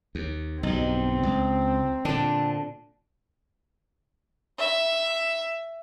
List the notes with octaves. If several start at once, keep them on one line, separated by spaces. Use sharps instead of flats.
D#2
B1 G2 C4 D#4
C#2
A#2 D3 D4
E5